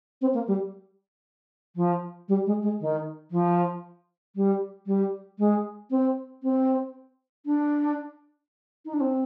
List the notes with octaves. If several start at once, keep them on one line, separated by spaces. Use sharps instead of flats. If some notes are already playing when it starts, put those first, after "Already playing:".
C4
A#3
G3
F3
G3
G#3
G#3
D#3
F3
G3
G3
G#3
C4
C4
D4
D#4
D4
C4